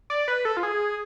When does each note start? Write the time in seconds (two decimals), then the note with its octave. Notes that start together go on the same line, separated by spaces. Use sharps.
0.10 D5
0.28 B4
0.45 A4
0.57 F4
0.63 G#4